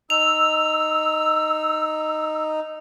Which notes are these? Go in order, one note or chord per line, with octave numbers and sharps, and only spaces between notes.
D#4 E6 F7